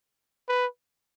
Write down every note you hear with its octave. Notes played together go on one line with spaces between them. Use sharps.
B4